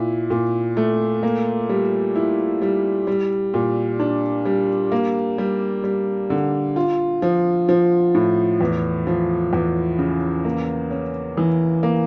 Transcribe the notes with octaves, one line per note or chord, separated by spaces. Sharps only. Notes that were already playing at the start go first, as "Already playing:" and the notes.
Already playing: A#2 E4
A#2
A3
A#3
G3
E4
G3
G3
A#2
D4
G3
A#3
G3
G3
D3
F4
F3
F3
A2
E2
F3
E2
C#3
A#3
C#4
E3
A#3